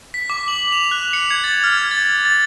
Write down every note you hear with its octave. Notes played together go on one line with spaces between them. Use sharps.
B6
D6
F#7
F7
F#6
C#7
G#6
A6
F6
G#6
A6
A6